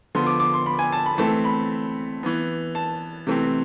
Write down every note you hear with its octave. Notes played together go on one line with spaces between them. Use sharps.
D3 F3 B3 C6
D6
D6
C6
B5
G#5
A5
B5
E3 A3 C4 A5
B5
E3 B3
A5
C3 E3 A3 C4